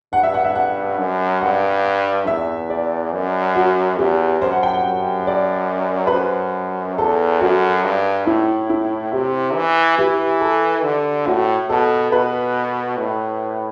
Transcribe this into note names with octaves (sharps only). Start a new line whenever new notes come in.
G2 F#5
E5
F#5
E5
F#5
F#2
G2 F#5
E2 E5
D5
F#2
F#4
E2 G4
F#2 C5
F#5
G5
F#5
F#2
D5
B4
F#2 C5
E2 A4
F#2 F#4
G2
A2 E4
E4
C3 G4
E3
E3 G4
A4
D3
A2 F#4
B2 A4
B2 B4
A2